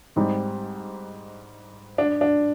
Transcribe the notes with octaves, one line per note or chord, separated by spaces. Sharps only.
G#2 G3 C4 D#4
D4
D4